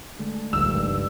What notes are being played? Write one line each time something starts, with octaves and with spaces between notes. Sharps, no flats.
D3 G#3 A3
G1 C#2 G2 D#3 F3 E6